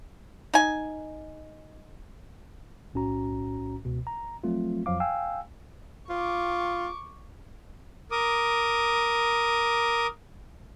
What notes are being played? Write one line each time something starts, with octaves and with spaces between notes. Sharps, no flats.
D#4 G#5
B1 A2 C#4 F#4 A#5
C#2 B2
A#5
F3 F#3 A3 C4 F4
F2 F3 F#3 F5 D6
F5 G5 G#5 E6
F4 C#6 D6
A#4 D6 D#6